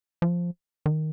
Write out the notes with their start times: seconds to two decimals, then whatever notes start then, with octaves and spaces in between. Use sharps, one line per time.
0.22 F3
0.86 D#3